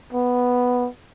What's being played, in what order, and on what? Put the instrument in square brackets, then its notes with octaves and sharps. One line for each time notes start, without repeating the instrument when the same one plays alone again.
[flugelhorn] B3